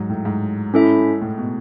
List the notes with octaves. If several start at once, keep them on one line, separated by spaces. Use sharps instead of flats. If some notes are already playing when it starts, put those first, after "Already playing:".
Already playing: G#2 F#3
A2
G#2
C#4 E4 A4 E5
A2
B2